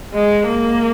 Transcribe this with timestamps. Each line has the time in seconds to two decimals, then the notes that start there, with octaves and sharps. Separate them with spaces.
0.14 G#3
0.47 A#3